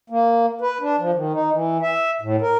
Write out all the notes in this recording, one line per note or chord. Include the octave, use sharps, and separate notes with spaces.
A#3
B4
D4
F3
D#3
D#4
E3
E5
A2
A#4